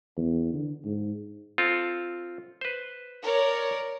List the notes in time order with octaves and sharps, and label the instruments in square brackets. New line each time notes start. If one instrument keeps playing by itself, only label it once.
[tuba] E2
D3
G#2
[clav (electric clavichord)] C4 F4 A4
B4 C5
[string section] A#4 C#5 D5